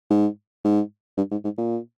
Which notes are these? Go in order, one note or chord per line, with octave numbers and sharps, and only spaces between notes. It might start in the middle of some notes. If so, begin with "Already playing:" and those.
G#2
G#2
G2
G#2
G#2
A#2